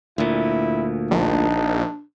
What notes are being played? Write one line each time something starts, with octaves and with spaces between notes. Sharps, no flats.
D2 A#2 E4
A#1 D4 D#4